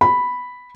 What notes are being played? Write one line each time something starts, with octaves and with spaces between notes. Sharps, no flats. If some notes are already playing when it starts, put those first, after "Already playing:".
B5